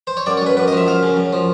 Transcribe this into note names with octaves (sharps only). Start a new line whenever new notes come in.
C5
C#5
F#2 D5
C#5
F#2 B4
F#2 B4
D#5
F3 E5
F#2 F5
C#3
F#2
F3